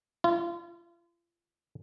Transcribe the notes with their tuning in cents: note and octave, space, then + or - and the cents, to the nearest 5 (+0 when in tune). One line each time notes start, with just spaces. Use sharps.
F4 -35